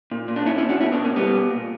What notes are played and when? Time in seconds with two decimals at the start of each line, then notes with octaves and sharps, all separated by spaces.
0.11 A#2
0.28 A#2
0.36 D4
0.46 A#2 C#4 E4
0.58 C#4 E4
0.64 A#2
0.69 D4 F#4
0.81 B2 C#4 E4
0.92 B3 D4
0.98 B2
1.04 A#3 C#4
1.16 B2 G3 B3
1.33 B2
1.51 A#2